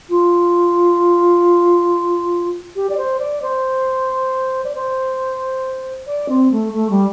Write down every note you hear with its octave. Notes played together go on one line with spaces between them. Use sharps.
F4
G4
D5
C5
D5
C5
D5
C5
D5
C4
A3
A3
G3